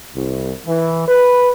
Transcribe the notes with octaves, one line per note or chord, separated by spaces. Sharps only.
C2
E3
B4